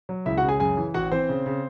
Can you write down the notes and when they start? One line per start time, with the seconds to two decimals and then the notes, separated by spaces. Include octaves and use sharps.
0.09 F#3
0.26 C#2 E4 E5
0.37 F#4 F#5
0.43 C#3
0.49 G#4 G#5
0.60 F#2 G#4 G#5
0.77 E3
0.94 A1 F#4 F#5
1.12 E3 C4 C5
1.29 C#3
1.46 C#3